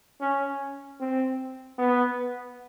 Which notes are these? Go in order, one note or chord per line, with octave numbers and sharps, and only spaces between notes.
C#4
C4
B3